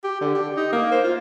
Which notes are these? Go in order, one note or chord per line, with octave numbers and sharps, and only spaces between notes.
G4
D3
G4
D#4
A#3
C5
F4